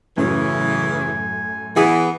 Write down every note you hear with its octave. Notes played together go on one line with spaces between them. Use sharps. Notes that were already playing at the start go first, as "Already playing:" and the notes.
F#2 A2 C#3 E3 G#5
E3 B3 G#4